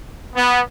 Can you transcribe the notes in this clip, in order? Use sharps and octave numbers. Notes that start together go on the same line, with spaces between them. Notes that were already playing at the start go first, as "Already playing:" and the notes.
B3